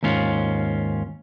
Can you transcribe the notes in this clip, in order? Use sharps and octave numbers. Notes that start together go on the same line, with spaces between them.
D#2 G#2 C#4 F4